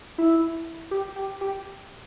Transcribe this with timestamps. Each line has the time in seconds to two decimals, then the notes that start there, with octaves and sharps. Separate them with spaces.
0.18 E4
0.91 G4
1.16 G4
1.41 G4